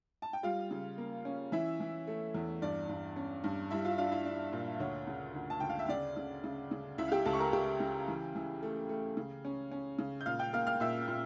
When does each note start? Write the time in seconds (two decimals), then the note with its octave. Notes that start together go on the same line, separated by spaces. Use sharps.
0.22 A5
0.33 G5
0.43 G3 F4 F5
0.71 C#3
0.98 A#3
1.25 C#4
1.52 E3 E4 E5
1.80 E3
2.07 A3
2.34 E2
2.62 G2 D5
2.89 G2
3.16 C#4
3.44 G2
3.71 G3 E4 E5
3.85 F4 F5
3.98 D4 F4 F5
4.12 E4 E5
4.25 D4
4.53 A#2
4.80 D2 C#5
5.07 C#3
5.34 D2
5.50 A5
5.60 D2 G5
5.69 F5
5.79 E5
5.89 C#3 D5
6.17 C#3
6.44 C#3
6.71 C#3
6.98 C#2 E4 E5
7.08 F5
7.12 G4 G5
7.25 C#2 A4 A5
7.33 C#6
7.39 A#4 A#5
7.53 C#2 G4 G5
7.80 C#3
8.08 E3
8.36 E3
8.63 A3
8.89 A3
9.17 C#3
9.45 C#4
9.71 C#4
9.99 C#3
10.21 G6
10.26 A#2 F5 F6
10.39 G5 G6
10.53 A#3 F5 F6
10.67 F5 F6
10.80 A#2 E5 E6
11.08 A#2